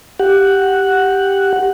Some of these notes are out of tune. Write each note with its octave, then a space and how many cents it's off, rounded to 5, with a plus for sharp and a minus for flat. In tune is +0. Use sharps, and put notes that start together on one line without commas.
G4 +0 F#5 +0